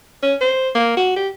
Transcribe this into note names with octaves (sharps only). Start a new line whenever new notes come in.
C#4
C5
A#3
F#4
G4